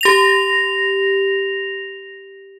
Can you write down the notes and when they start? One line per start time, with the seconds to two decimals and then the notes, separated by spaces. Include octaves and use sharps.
0.01 G4 A#6 F7